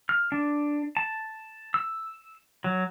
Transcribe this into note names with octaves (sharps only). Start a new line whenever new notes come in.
F6
D4
A5
E6
F#3